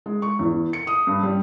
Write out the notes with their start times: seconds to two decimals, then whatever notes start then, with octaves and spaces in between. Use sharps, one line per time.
0.06 G#3
0.22 C#6
0.39 E2
0.73 C#7
0.87 D#6
1.07 G2
1.23 G3